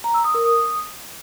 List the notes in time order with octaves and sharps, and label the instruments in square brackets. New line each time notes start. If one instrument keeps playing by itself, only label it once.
[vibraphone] A#5
E6
D#6
A#4
D#6